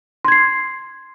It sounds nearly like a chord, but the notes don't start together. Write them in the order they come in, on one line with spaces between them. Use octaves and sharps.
C6 G#6 C7